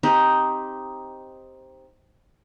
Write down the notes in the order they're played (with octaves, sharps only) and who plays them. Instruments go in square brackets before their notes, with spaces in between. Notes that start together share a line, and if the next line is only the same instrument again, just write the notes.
[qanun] C4 D#4 G4